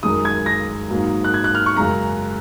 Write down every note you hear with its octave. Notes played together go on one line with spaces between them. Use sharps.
F#2 D#3 G#3 D#6
G#6
A#6
G#2 F#3 A#3
F#6
G#6
F#6
F6
C#6
F#2 C#3 G#3 A#5